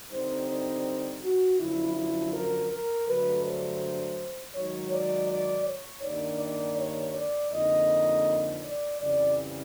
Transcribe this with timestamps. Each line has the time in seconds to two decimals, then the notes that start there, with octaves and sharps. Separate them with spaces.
0.10 D3 G3 C4 D#4 C5
0.48 C5
1.22 F#4
1.59 F#2 D3 F3 E4
1.95 E4
2.33 A#4
2.71 A#4
3.07 G2 D3 F#3 A3 B4
3.44 C5
4.55 G#2 D#3 F#3 C#5
4.93 D5
5.30 D5
5.66 C#5
6.03 G2 D#3 G3 A#3 D4 D5
6.40 D5
6.78 C#5
7.15 D5
7.51 F2 D3 F3 A#3 D#4 D#5
8.63 D5
8.99 F2 C#3 E3 G3 D5